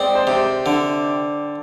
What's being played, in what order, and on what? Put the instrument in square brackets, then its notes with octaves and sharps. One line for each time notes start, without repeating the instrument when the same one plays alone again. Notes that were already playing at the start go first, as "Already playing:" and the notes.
Already playing: [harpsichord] G#3 C4 [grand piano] D5 G5
[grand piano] C5
[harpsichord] C3
[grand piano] C5
[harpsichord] D3